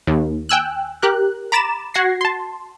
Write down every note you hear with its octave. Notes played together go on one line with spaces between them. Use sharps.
D#2
G5 G#5 E6 F#6
G4 A#4 F#6
A#5 B5 D6 A6 E7
F#4 F#5 G#6 A#6 C7
A5 C6